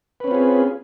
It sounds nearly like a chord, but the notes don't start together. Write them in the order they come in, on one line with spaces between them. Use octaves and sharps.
B4 C#4 C4 F4 G#4